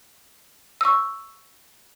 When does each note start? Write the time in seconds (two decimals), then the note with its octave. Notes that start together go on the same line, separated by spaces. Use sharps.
0.81 C#6 E6